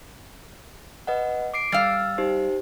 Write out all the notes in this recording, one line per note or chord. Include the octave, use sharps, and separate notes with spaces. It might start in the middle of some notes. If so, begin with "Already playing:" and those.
B4 D#5 F#5
D6 C7 D7
G3 F5 E6 F6 A6
D#4 G4 C5